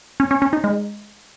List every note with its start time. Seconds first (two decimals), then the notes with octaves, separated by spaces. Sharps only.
0.20 C#4
0.31 C#4
0.42 C#4
0.53 D#4
0.64 G#3